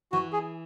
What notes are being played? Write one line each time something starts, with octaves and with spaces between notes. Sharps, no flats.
E3 F#4
G#4